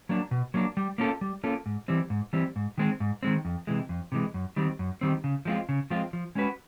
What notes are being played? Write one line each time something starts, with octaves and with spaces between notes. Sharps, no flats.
F#3 A#3 D4
B2
F#3 A#3 D4
G3
A#3 C#4 F4 A4
G3
A#3 C#4 F4 A4
G#2
E3 G3 C4
G#2
E3 G3 C4
G#2
D#3 G#3 C4
G#2
D#3 G#3 C4
F2
C3 E3 G#3
F2
C3 E3 G#3
F#2
D#3 G3 C4
F#2
D#3 G3 C4
C#3
F3 G#3 C4 F4
C#3
F3 G#3 C4 F4
F3
G#3 C#4 F#4 B4